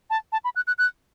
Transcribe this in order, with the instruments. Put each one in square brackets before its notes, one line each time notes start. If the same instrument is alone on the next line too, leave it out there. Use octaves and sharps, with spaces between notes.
[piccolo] A5
A5
B5
F#6
F#6
F#6